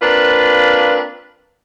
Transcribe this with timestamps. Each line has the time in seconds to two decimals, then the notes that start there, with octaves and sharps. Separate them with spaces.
0.02 A#3 C4 D4 F4 B4